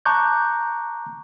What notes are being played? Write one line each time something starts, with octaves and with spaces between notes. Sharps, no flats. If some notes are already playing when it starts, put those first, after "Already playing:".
A5 A#5 C#6 D6 F#6 G6